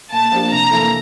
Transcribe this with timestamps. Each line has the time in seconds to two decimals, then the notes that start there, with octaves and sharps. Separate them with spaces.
0.11 A#2 A5
0.32 F3 A#3 D4 G4
0.51 C3 A#5
0.71 E3 A#3 E4 A4